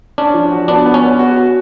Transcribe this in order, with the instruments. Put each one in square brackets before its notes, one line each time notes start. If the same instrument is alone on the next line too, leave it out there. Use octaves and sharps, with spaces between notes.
[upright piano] C#4 [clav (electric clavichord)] D4
[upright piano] F3
F#4
[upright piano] B3 [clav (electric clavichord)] D4
[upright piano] B3
[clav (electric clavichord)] C#4
[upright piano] B3
F#4
F#4